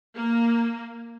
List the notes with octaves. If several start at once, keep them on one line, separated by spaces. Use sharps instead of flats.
A#3